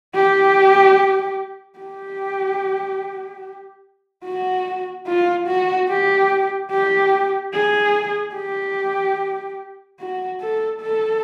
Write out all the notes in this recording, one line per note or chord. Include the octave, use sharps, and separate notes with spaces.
G4
G4
F#4
F4
F#4
G4
G4
G#4
G4
F#4
A4
A4